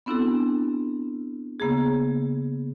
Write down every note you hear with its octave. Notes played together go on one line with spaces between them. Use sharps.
B3 C4 D4 E4 F#4 A4
C#3 A#3 B3 G#4